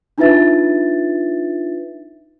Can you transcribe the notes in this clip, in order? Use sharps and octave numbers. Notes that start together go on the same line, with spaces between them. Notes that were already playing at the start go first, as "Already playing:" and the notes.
D4 D#4 F4 B4 E5 A6